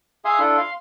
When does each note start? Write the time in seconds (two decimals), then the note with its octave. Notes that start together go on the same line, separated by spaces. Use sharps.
0.25 G#4 E5 F5 G#5 C6 D#6
0.39 D4 E4 F4 A4
0.58 F5 C6